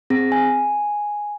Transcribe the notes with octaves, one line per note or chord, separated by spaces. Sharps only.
C4 G#4 A#6
G#5